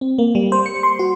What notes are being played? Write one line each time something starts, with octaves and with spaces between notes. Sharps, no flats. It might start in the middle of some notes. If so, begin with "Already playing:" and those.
C4
A#3
G3
C5
C#7
C6
F#4